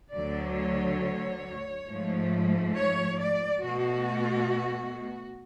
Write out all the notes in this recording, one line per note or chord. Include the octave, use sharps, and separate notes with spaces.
D2 D3 F#3 D5
C#5
G#2 F3 A3
C#5
D5
B2 A3 F#4